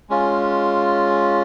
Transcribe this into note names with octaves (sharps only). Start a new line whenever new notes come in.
G#3 C#4 F4